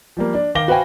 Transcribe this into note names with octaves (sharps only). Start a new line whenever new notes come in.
F3 G3 A#3
D4
D#3 F5 D6 A#6 G7
F#4 B4 C5 F5 G5 G#5